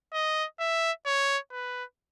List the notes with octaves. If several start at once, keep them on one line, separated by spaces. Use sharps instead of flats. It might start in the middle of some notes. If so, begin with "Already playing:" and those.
D#5
E5
C#5
B4